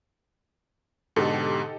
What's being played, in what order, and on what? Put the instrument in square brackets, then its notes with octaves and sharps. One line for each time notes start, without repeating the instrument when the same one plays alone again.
[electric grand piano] G#2 B2 D3 [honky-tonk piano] D#4 G4 A4